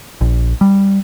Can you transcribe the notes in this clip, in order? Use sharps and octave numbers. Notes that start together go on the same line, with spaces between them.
A#1
G3